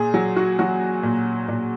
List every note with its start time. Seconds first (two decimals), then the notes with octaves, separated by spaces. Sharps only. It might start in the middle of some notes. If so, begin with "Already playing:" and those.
Already playing: A#2 G#4
0.14 F#3
0.36 F#4
0.59 F#3 F#4
1.03 A#2
1.48 A#2